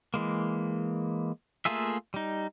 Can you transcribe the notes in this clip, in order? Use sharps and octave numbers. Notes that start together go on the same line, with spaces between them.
E3 G#3 A#3
A3 A#3 F4 G#4 E5
G3 D#4